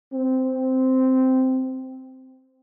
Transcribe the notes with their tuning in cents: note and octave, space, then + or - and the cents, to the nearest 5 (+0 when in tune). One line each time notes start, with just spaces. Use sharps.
C4 -10